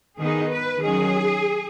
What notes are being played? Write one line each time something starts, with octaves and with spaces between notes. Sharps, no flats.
D#3 B3 D#4 G#4
B4
D#3 F#3 C#4 G#4